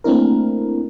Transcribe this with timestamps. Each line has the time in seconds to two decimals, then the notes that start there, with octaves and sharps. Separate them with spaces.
0.04 A3 A#3 C4 D4 E4 A#4